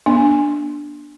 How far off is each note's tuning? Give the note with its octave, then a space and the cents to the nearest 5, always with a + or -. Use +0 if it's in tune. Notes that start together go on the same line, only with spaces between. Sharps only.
B3 -35 D4 +0